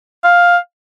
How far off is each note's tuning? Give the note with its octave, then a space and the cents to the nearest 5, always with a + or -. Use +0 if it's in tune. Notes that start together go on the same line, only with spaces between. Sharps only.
F5 +10